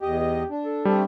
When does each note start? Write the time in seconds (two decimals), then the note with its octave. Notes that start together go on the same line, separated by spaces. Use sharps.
0.01 E2 G4 D#5
0.20 G4
0.50 D4
0.65 A4
0.85 G3 A3 C4 D4